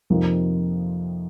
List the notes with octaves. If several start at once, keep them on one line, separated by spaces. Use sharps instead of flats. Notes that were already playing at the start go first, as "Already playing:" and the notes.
F2 C3 F3 A#3 D#4